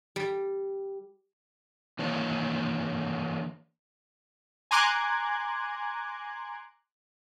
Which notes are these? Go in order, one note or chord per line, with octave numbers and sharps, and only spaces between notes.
G3
E3 A#3 D4 C#5
G#5 A#5 C6 D6 F#6 G#6